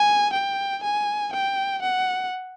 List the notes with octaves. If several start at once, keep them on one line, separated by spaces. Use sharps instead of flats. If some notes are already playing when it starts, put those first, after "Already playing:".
Already playing: G#5
G5
G#5
G5
F#5